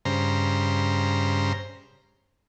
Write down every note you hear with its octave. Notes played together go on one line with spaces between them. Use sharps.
G2 C#3 C5 A#5